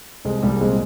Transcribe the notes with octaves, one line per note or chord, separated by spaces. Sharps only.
C2 G#3 C4
C2 G3 A#3
A#2 G#3 C4